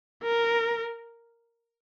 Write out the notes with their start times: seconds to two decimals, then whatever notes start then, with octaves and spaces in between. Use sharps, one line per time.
0.23 A#4